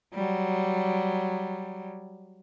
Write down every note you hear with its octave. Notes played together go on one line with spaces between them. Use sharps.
F#3 G3